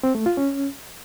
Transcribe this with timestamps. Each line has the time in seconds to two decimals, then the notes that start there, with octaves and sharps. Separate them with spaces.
0.03 C4
0.15 A3
0.26 F4
0.37 C#4